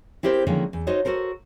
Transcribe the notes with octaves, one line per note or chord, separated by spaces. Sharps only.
C4 E4 G4 A#4 C5
D3 D#3 F3 G#3 A#3 C#4
E2
D#4 F#4 A4 C5 C#5 D#5
F#4 A4 A#4 C5